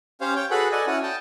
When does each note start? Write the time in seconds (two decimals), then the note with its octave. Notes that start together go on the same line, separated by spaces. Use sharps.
0.21 C#4 G4 C5 C#5 F5
0.36 C#5 G5
0.51 F#4 G#4 A4 B4 F#5 B5
0.72 A4 D5 D#5 F#5 G#5
0.87 C#4 E4 F#4 C#5 F#5 G#5
1.03 G5 A5 D#6